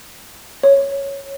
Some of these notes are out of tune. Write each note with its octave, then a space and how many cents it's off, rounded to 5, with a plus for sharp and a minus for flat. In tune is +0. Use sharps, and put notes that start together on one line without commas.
C#5 -5